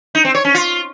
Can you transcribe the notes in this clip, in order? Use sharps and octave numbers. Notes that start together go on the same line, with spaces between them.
D#4
C4
C#5
C#4
F4